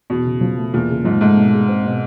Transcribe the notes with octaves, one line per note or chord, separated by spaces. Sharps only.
E2 B2
C#3
F3
A3
E2 A#2
C#3
G#2 F3
G#2 A3
B2
G#3
C4
B2